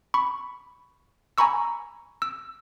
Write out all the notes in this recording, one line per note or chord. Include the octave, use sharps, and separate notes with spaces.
B5 C#6
G#5 A#5 B5 C#6 E6
E6